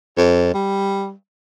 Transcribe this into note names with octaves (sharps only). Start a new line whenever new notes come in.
F2
G3